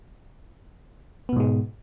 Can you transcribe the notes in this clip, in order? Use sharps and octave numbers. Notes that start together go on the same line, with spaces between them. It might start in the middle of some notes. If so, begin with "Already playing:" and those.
G#2 B2 G#3 B3